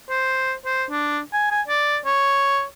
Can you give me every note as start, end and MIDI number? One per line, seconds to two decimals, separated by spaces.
0.10 0.54 72
0.65 0.85 72
0.90 1.20 62
1.33 1.47 80
1.51 1.61 80
1.68 1.98 74
2.05 2.64 73